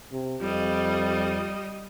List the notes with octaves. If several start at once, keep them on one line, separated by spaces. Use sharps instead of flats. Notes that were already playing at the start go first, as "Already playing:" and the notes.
C3
F2 G3 D#5